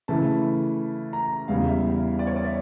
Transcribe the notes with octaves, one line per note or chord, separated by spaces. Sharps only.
C#3 E3 A3 E4 A5
A#5
E2 C#3 G3 F5
E5
D5
C#5
D5
E5